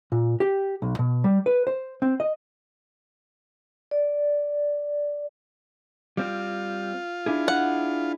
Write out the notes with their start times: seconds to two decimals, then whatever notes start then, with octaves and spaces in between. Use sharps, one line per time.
0.12 A#2
0.40 G4
0.82 B1
0.99 B2
1.24 G3
1.46 B4
1.67 C5
2.02 C4
2.20 D#5
3.91 D5
6.17 G3 C4 F4
7.26 D4 E4 G#4
7.48 F#5